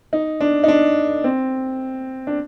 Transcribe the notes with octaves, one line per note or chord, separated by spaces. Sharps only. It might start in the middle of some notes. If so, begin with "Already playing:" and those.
D#4
D4
D#4
D4
C4
D4